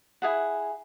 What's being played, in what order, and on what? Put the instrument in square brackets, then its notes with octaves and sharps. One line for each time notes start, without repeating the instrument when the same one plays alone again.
[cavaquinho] E4 G#4 F#5